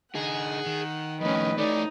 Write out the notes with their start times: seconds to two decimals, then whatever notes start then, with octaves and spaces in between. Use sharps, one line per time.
0.15 D3 D#4 G#4 F#5
0.66 D#3
1.22 F2 A2 C#4 B4 D#5
1.58 A3 C#4 D#4 D5